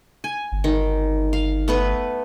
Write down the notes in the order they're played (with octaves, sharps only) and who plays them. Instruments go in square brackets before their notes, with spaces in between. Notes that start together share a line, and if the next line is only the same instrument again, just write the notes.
[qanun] G#5
[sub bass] G1
[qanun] D#3
F5
A3 B3 B4